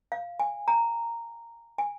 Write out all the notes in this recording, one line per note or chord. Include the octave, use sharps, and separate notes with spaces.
F5
G#5
A#5
G#5